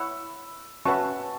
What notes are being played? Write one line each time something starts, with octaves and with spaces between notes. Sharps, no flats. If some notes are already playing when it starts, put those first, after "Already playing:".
Already playing: E4 C#5 F#5 B5 E6
C#4 F#4 B4 E5 A5 C#6